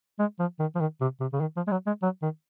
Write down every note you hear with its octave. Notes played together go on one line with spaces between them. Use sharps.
G#3
F3
D#3
F3
D#3
C3
C3
C#3
D#3
F3
G#3
F#3
G#3
F#3
D#3